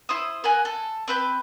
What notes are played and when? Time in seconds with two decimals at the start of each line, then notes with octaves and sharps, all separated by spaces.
0.09 E4 C5 D#6
0.44 A#4 F#5 G#5
0.65 A4
1.08 C4 B4 G6